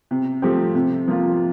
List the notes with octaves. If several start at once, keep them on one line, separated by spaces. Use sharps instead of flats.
C3
F3 A3 C4 G4
C3
F3 A#3 F4